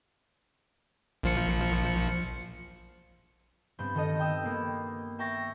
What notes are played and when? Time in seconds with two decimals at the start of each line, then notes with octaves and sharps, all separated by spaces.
1.23 A#1 F3 C#7
3.79 G2 B3 C4 G6
3.95 D#3 D#4 A4 D#5
4.19 G5 D#6 E6
4.43 A#3 B3
5.19 E5 G5 A#5 C#6 A6 A#6